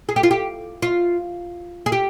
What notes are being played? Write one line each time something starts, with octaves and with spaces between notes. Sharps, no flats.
G#4
G4
F4
G4
F4
G#4
G4